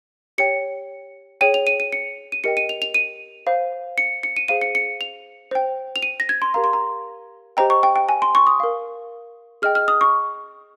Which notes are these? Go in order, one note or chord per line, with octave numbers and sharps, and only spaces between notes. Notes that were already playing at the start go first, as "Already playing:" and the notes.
G4 C#5 G5 C#7
G#4 C#5 G5 D#7
F7
D#7
D#7
C#7
D#7
G4 A#4 D#5 G5 C#7
D#7
F7
F7
D#7
C5 F5
C#7
C#7
D#7
G#4 C5 F5 D#7
C#7
C#7
F7
C5 G5
F7
D#7
A#6
G#6
C6
G4 A#4 F5 A#5
C6
A#5
G4 C5 D#5 G5 A#5
C#6
G5
G5
G#5
C6
C#6
D#6
A#4 F5
G#4 D#5 G5 F6
F6
D#6
C#6